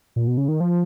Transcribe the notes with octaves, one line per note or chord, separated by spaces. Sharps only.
A#2
B2
C#3
D#3
F3